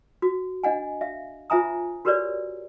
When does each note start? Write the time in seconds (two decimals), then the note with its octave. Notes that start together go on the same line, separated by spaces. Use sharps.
0.22 F#4
0.64 D4 D#5 F#5 G#5
1.01 E5 F5
1.50 F4 C5 E5 G#5 A#5 D#6
2.05 F#4 G4 A#4 B4 C#5 D5